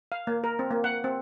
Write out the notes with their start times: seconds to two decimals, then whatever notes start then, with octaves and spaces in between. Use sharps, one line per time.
0.12 F5
0.27 A#3
0.44 A#4
0.59 C4
0.71 A#3
0.84 F#5
1.04 C4